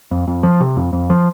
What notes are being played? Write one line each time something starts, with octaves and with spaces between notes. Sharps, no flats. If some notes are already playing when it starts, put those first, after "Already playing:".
F2
F2
F3
C3
F2
F2
F3